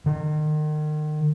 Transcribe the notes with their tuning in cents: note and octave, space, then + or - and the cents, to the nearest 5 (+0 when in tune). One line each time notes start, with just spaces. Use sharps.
D#3 -35